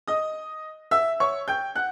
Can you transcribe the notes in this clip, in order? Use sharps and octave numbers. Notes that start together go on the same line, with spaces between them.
D#5 D#6
E5 E6
C#5 C#6
G5 G6
F#5 F#6